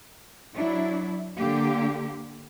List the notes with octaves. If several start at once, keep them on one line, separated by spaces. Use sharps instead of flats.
F#3 D4 E4
D3 A#3 G4